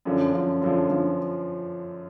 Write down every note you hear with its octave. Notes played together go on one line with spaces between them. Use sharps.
F#2 D3 F3
F#2 D3 F3
F#2 D3 F3
D3 F3